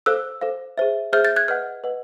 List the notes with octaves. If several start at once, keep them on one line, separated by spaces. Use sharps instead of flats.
A4 C5 F5 E6 F#6
A4 C5 F5
G#4 C5 E5
G#4 C5 E5 F6 G6
G6 A6
F#6 G#6
B4 D#5 F#5 F6 G6
B4 D#5 F#5